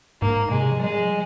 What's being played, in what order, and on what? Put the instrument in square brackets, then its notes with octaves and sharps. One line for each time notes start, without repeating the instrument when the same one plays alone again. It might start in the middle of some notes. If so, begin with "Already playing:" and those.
[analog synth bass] G#2 [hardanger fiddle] A#3
[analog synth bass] C3 [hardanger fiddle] G#3
[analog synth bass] F3
[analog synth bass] G3 [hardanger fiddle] G#3
[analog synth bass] F3